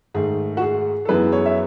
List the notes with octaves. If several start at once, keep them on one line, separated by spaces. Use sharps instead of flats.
G#2 D#3 A3 G#4
F#4
G#4
A4
F#2 E3 G#3 B3 B4
C#5
E5